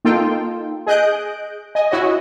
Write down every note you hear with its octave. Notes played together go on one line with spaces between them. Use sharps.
A#3 D#4 F4 A4 G5
G#4 D#5 F#6 G6 D7
D#5 G#5
E4 F#4 C#5 D#5